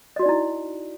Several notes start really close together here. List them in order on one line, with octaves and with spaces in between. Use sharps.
D#5 F#4 D5 D#4 E4